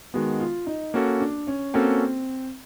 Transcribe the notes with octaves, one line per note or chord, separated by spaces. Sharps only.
D#3 G#3 B3 F#4
F4
D#4
A#3 C#4 F#4 A4
D4
C#4
A#3 C4 C#4 F#4 A4